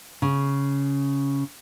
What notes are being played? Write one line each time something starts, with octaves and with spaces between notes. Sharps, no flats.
C#3